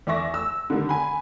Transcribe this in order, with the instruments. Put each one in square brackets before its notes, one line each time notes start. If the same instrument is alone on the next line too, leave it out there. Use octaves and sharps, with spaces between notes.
[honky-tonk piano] E2 D5 E5 C#6 A#6
E6
D3 D#3 G3
G#5 B5